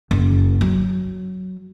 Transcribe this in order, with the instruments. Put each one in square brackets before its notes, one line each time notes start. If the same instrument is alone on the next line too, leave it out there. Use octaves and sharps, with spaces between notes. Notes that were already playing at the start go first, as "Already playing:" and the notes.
[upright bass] F#1
F#3